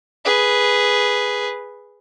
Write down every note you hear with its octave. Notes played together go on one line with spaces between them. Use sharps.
G#4 B4